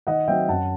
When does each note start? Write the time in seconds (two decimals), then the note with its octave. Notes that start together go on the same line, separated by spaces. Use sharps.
0.07 D#3 D#5 F#5
0.27 F#3 C4 E5 G5
0.49 F#2 F#5 A5